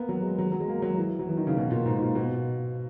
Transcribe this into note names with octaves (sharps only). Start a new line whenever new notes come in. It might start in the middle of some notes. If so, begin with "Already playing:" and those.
Already playing: A#3 B3
F#3
G#3
F#3
F#3
G#3
A#3
F#3
E3
F#3
E3
D#3
C#3
B2
A#2
G#2
A#2
B2